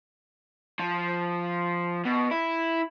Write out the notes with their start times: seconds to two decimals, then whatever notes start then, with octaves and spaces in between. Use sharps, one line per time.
0.79 F3
2.05 B2
2.31 E4